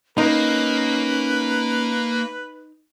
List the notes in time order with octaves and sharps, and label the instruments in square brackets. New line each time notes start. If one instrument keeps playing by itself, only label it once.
[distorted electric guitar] A#3 [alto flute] C#4 [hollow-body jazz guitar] D#4 [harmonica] B4